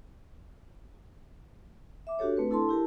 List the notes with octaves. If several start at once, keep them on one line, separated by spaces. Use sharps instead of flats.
E5 D6
D4 F#4 G4 A4 C#5
A3 C4 B4
D4 E4 A4 A5 C6
E4 G4 A#4 A5